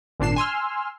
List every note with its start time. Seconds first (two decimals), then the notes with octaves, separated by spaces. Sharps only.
0.20 G#1 A#2 D4 C7 E7
0.36 G#5 C6 E6 F6